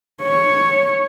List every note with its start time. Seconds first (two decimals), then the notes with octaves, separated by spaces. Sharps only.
0.22 C#5